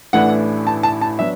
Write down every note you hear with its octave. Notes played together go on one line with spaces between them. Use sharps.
A1 A2 E3 A3 D4 F#5
A5
A5
A5
F#3 B3 D4 E5